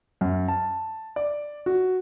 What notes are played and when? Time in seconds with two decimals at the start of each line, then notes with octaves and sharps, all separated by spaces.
0.21 F#2
0.48 A5
1.16 D5
1.66 F#4